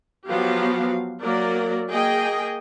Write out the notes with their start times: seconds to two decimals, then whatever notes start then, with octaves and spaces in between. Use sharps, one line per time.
0.27 F3 F#3 B3 F#4 G4 F5
1.22 F#3 A#3 A#4 D5
1.89 A#3 G#4 D#5 G5